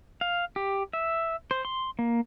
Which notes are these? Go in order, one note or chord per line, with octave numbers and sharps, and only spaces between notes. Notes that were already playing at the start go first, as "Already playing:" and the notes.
F5
G4
E5
C5
C6
A#3